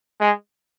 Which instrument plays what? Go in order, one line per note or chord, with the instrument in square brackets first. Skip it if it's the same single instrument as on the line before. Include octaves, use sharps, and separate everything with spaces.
[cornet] G#3